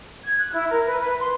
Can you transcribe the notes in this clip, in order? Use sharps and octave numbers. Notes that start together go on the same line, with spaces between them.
G#6
F#6
E4
A#4
B4
B4
C6